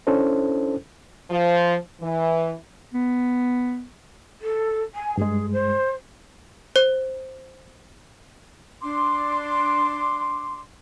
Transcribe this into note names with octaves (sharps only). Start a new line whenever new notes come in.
C#4 D4 E4 A4 C5
F3
E3
B3
A4
G#5
G2 G#3 G#4
C5
C5
D4 C6 D6